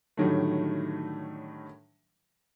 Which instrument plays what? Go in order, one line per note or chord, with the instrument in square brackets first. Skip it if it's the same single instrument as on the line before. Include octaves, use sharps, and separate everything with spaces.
[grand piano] A2 D3 D#3 F#3 G3 A3